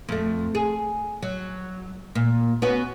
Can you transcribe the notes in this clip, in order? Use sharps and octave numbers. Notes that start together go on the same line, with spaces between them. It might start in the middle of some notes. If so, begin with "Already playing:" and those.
F2 A3
G#4
F#3
A#2
B3 C#4 F#4